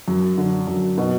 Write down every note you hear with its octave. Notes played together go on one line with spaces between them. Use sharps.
F#2
D3
F#2
B2